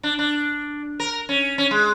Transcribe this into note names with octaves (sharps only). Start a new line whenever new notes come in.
D4
D4
A#4
C#4
C#4
G#3